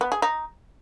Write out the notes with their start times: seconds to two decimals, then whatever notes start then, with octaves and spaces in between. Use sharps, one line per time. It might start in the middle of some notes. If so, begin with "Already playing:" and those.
0.01 B3
0.12 G#4
0.22 D#4